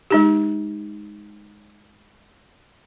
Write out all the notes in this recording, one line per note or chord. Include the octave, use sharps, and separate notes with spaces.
G#3 D#4 G4